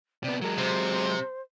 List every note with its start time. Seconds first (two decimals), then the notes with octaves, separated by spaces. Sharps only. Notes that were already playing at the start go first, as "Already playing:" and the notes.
0.24 C3 B3 D5
0.42 F#3 G#3 A#4
0.58 C3 C5